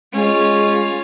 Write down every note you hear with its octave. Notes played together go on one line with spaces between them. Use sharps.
G#3 C#4 F4